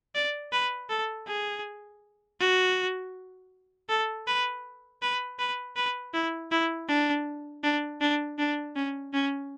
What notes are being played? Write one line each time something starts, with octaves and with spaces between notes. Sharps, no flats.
D5
B4
A4
G#4
F#4
A4
B4
B4
B4
B4
E4
E4
D4
D4
D4
D4
C#4
C#4